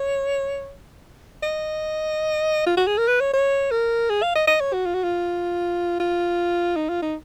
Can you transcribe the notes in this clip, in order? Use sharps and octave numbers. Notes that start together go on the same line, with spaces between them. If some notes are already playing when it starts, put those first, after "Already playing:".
Already playing: C#5
D#5
F4
F#4
G#4
A#4
B4
C#5
C#5
A#4
G#4
F5
D#5
D#5
C#5
F#4
F4
F#4
F4
F4
D#4
F4
D#4